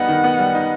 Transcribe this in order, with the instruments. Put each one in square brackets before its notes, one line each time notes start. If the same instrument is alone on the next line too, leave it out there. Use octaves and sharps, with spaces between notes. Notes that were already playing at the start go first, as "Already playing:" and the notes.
Already playing: [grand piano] G3 B3 D#4 [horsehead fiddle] F#5
[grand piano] D#3
B3
G3
D#4